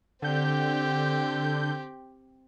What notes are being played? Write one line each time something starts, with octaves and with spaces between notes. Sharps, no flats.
D3 C4 G4 G6